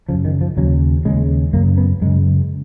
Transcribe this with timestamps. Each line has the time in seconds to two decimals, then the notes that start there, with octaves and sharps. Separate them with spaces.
0.09 F#2 C#3 F3
0.25 D#3
0.41 F3
0.57 D#2 C#3 F#3
1.05 D#2 C#3 G#3
1.53 F#2 C#3 A#3
1.78 B3
2.01 F#2 C#3 G#3